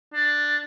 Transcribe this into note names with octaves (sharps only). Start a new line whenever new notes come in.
D4